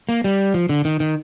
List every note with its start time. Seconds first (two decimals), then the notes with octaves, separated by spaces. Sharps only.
0.09 A#3
0.24 G3
0.54 F3
0.69 D3
0.85 D#3
1.00 D#3